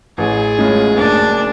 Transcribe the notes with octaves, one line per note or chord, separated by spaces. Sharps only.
A1 G#4
A2 G#3 C#4 F4
F#1 D4